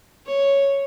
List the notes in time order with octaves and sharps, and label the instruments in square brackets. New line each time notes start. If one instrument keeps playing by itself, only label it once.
[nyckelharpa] C#5